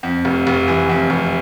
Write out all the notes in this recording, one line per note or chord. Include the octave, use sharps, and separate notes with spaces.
F2
F1
F1
E3
F2
F1